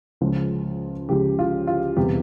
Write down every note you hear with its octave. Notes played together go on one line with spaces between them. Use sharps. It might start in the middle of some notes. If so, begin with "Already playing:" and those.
C#2 C#3 F3 G#3
C#2 C#3 F3 G#3 G4
F4
F4
E1 E2 C3 G3 G4